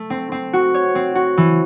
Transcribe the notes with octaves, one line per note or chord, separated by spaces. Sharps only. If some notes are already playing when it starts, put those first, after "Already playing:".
Already playing: A3
C4
C4
F#4
C#5
C4
F#4
E3